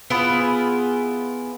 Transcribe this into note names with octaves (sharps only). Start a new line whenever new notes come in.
B3 E4 F4 G#4